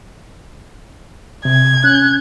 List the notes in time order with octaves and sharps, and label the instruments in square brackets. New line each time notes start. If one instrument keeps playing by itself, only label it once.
[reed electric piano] C3 [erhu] G#6
[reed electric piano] C#4 [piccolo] F#6